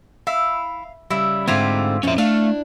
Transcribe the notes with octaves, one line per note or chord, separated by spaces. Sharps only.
E4 F5
C#3 G3 E4
D2 G#2 D3 A3 C4 E4 F4 G4
F2 A#2 C#4 E4 E5
A3 D4 E4 F5